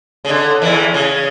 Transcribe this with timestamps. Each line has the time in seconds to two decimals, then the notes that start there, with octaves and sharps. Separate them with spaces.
0.25 C#3
0.29 D3
0.62 E2 E3
0.94 C#3